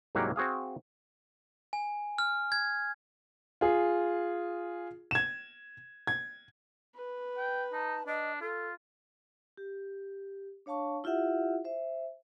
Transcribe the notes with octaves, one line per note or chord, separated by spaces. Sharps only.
C2 G#2 F#3 A#3 G4 F#5
C4 F#4 G#4 F5
G#5
F6
G#6
F4 G#4
G#6 E7
G#6
B4
G5
D#4 A5
D4 D#5
F4 A4
G4
D4 C#5 F5 A5 C#6
E4 F4 G4 E5 F#5
C5 E5